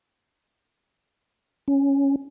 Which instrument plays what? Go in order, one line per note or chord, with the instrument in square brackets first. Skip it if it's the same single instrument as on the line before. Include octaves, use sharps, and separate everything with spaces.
[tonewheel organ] C#4